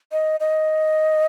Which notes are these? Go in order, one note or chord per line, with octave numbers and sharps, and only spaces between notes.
D#5
D#5